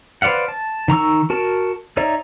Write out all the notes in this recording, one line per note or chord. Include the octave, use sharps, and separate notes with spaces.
B4 C5 D5 F5 F#5
A5
D#3 A#5 C#6 E6
F#4 A#4 A5
D#4 C#5 D5 E5 A#5